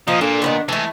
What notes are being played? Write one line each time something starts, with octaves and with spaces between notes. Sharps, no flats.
A#2 F3 F4 D#5
A#2 D4 A4
D#3 F3 B3
E3 G#3 A3 A4